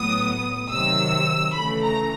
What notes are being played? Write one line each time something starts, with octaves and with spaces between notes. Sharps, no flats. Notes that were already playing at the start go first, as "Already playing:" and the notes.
Already playing: A2 F#3 B3 D#6
C3 D#3 F#3 E6
C#3 E3 A3 B5
A#5